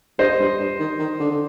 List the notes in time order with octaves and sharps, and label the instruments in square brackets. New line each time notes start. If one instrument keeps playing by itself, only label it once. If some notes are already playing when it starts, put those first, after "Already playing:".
[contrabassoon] G2 [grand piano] C5 D#5
[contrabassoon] G2
G2
D#3
D#3
D3
D3